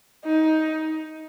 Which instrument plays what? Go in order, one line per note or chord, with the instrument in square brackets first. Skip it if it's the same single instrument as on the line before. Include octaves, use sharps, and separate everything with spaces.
[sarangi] D#4